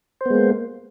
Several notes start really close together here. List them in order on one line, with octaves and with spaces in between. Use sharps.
C5 B3 G#3 A#3